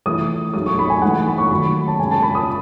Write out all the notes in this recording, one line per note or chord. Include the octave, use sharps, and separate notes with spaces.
E3 A3 E4 D#6
F#3 A3 D#4 D#6
C#6
B5
G#5
E3 A3 D#4 F#5
B5
C#6
D#3 F#3 A3 B5
A5
C#3 G#3 C#4 G#5
A5
B5
D#6